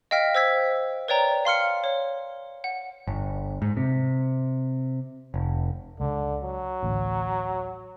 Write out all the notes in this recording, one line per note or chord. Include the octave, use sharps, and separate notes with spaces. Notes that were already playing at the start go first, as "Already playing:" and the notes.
D#5 F5 G5 F6 B6
C5 E6 G#6 B6
B4 C#5 D5 G5 A#5
F5 C6 F6 C#7
C#5
F#5
G1
G#2
C3
F1
C#2 D3
F#3
A1 D2